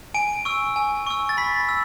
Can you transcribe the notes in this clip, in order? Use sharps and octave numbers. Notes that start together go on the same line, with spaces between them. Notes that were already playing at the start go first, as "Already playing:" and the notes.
G#5 D7
C#6 E6
G#5
C#6 E6
A6
B5 B6
E6